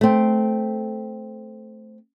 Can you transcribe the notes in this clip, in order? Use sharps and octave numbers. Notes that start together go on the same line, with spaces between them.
A3 C4